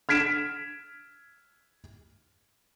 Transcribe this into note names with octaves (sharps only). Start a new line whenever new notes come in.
F6 G#6 B6 D7 E7